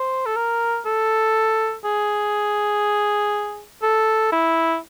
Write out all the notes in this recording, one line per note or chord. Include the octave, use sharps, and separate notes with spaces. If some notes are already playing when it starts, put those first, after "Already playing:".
Already playing: C5
A4
A#4
A4
G#4
A4
E4